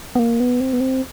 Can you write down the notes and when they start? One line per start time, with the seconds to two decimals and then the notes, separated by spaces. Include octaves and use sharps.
0.15 B3
0.19 A#3
0.40 B3
0.60 C4
0.73 B3
0.80 C4